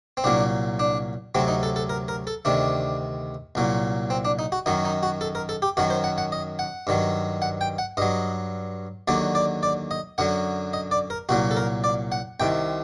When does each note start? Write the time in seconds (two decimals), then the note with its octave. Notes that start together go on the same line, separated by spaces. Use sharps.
0.17 C4
0.24 C2 A#2 F#3 D4
0.79 D4
1.35 D2 C3 F#3 C4
1.48 D#4
1.63 A4
1.76 A4
1.89 A#4
2.08 A#4
2.27 A4
2.45 D2 C3 D#3 D4
3.55 C2 A#2 F#3
4.10 C4
4.25 D4
4.39 D#4
4.52 F#4
4.66 F#2 D#3 F#3 D#4
4.85 D#4
5.03 F#4
5.21 A4
5.35 A#4
5.49 A4
5.62 G4
5.77 F#2 D#3 F#3 F#4
5.90 C5
6.04 F#5
6.18 F#5
6.32 D#5
6.59 F#5
6.87 G2 D#3 F#3
7.42 F#5
7.61 G5
7.78 F#5
7.97 G2 F#3 D#5
9.08 D#2 D3 F#3 D5
9.35 D5
9.63 D5
9.91 D#5
10.18 F#2 D3 F#3 F#5
10.73 D#5
10.91 D5
11.10 A#4
11.29 C2 A#2 F#3 F#4
11.51 A4
11.57 A#4
11.84 D5
12.12 F#5
12.40 C2 C3 D#3 G5